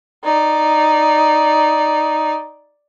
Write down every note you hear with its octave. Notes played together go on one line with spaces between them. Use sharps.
D#4 D5